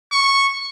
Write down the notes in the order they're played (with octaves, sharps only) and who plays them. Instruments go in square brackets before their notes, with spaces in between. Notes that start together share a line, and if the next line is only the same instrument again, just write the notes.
[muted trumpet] C#6